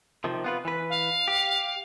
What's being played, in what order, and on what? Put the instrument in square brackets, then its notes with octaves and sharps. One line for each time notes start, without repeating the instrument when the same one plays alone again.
[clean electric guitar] C3 D#3 F3
B3 F4 B4
E3 B4
[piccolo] F5
[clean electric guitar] G4